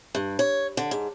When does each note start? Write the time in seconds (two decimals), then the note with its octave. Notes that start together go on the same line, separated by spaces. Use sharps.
0.15 G2
0.39 C#5
0.77 D3
0.91 G#2